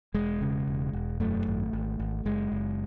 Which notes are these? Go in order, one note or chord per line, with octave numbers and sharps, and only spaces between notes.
E1 G#3
C#3
E1
E1
F#2 A3
G#1
G#1
G#1
F#1 G#3
F#1